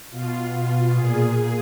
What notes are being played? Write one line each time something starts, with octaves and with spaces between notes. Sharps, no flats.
B2 F4
A#2 G#4